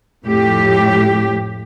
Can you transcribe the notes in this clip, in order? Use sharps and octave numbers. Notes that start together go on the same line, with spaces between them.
F2 A2 G4